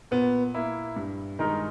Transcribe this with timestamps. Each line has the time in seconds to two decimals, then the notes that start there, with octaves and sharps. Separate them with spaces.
0.11 A#2 B3
0.54 A#3 E4
0.96 G2
1.39 D#3 G#3 D#4 A#4